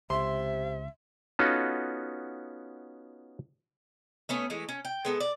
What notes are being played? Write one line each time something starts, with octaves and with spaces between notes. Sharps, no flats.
C#2 C3 E5 C6
B3 C#4 D#4 F4 F#4 A4
A3 B3 C#4
E3 G#3 A3
C#4
G5
G#3 B3 A4
D5